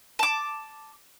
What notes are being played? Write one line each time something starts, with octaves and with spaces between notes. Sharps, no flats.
A5 D6